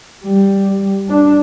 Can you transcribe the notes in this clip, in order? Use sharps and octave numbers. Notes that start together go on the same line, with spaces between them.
G3
D4